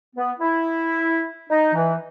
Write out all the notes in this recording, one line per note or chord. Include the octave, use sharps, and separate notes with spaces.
B3
E4
D#4
E3